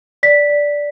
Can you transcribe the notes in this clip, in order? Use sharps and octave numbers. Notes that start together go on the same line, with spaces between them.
D5 B6
D5